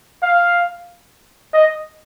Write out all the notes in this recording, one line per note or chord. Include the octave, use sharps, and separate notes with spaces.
F5
D#5